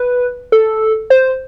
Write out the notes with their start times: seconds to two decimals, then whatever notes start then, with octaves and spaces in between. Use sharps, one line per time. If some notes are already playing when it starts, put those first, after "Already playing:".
Already playing: B4
0.52 A4
1.10 C5